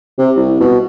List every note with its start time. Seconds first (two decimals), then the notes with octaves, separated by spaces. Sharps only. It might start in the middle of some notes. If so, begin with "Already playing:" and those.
0.18 C3
0.36 C2
0.60 B2